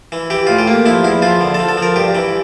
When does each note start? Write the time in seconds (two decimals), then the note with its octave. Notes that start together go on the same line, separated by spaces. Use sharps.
0.12 E3
0.30 E3 G4
0.47 A2 F4
0.58 G4
0.67 A#3
0.86 F3 E4
1.04 E2 E4
1.22 F3 F4
1.41 D3
1.54 A4
1.59 F3
1.69 A4
1.77 F3
1.83 A#4
1.96 G2 G4
2.15 E3